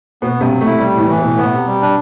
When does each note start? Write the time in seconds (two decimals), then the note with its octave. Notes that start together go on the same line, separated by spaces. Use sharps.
0.22 B2 B3
0.37 G2 C3
0.50 F#3
0.61 A3
0.66 E4
0.79 G3
0.94 A2
0.99 E3
1.09 E3
1.18 B2
1.23 A2
1.37 B2 B3
1.52 C3
1.66 G3
1.81 D4